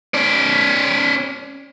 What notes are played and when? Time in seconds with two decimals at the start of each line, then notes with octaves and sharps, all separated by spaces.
0.14 C#4 D5